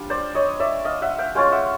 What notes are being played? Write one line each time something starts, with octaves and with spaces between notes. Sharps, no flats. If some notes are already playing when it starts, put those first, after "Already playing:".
Already playing: G3 D4 F4
C5 D5
C#5 D#5
D5 E5
D#5 F5
E5 F#5
F5 G5
G#3 C#4 F4 F5 G5
E5 F#5